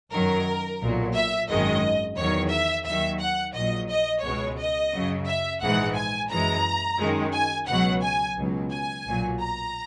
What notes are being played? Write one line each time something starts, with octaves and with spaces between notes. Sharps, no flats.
F#2 D#3 F#3 A#4
B1 A#2 F#3
E5
G#1 F#2 D#3 G#3 D#5
E2 D#3 F#3 C#5
E5
D#2 D#3 F#3 E5
F#5
A#1 A#2 F#3 D#5
D#5
C#2 B2 G#3 C#5
D#5
F#2 C#3 F#3
E5
A#1 G#2 E3 G#3 F#5
G#5
F#2 E3 G#3 A#5
F#2 D#3 G#3
G#5
C#2 B2 F#3 F#5
G#5
C#2 B2 F#3
G#5
B1 A#2 F#3
A#5